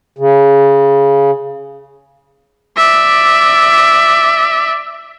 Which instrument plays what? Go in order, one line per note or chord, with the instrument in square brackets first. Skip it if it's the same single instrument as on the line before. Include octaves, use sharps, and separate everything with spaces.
[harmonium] C#3
[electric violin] D5 E5